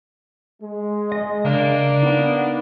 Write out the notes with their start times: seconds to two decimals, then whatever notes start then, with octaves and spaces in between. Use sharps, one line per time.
0.62 G#3
1.12 D#5
1.44 C#3 A#3 D4
2.03 B3 D#4